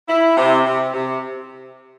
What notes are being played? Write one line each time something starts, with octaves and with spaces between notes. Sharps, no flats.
E4
C3
C3
C3